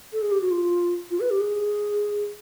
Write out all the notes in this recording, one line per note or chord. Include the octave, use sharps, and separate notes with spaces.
A4
G#4
G4
F#4
F4
F4
B4
G4
G#4